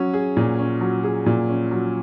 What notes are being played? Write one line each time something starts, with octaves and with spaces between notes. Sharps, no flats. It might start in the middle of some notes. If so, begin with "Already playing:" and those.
Already playing: F#3 C#4
G#4
A#2
C#4
F#3
G#4
A#2
C#4
F#3